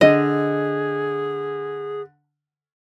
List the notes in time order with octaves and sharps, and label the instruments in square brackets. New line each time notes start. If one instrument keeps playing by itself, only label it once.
[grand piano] D3 [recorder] G#4 [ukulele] D#5